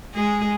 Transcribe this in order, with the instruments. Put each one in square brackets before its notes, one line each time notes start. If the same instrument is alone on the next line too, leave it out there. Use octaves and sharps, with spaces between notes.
[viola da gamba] G#3 G#4